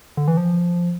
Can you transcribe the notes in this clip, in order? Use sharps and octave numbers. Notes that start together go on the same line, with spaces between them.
D3
E3
F3